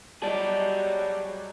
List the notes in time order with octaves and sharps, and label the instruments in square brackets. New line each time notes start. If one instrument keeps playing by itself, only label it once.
[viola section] F#3 G3 [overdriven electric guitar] G#4 D5 [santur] D#5 A5